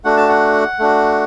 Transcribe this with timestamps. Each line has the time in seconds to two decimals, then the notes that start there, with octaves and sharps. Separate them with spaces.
0.05 A3 D4 F#4 F#5
0.17 A5
0.28 F#5
0.79 A3 D4 F#4